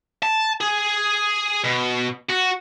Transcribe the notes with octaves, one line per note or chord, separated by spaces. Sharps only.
A5
G#4
B2
F#4